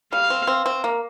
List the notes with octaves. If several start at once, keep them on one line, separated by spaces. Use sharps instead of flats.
G3 F5
C4
C4
C4
A#3